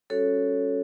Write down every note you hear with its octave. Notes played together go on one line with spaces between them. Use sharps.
G3 C#4 F#4 A4 C#5